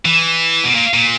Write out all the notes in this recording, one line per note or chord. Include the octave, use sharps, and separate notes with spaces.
E3
B2
A#2
A#2